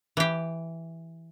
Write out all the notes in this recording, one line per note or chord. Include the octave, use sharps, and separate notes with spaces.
E3 G4